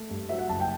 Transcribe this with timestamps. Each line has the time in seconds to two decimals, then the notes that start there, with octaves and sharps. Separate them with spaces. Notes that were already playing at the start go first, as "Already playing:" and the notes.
Already playing: A3
0.10 G2
0.29 F#3 E5
0.39 F#5
0.49 F#1 A5
0.60 G5